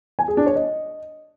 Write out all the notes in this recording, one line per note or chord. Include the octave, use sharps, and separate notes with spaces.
G#5
G#4
D4
C#5
D#5